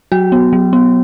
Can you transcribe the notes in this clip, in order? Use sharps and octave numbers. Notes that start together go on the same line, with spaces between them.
F#3 F#4
B3
F#3
B3